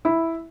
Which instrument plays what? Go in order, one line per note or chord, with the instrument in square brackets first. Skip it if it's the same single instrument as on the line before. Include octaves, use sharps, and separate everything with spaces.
[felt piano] E4